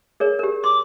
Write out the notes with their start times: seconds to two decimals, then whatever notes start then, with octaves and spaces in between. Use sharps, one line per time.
0.20 G#4 A#4 C#5
0.39 G4 A#4
0.64 C6 D6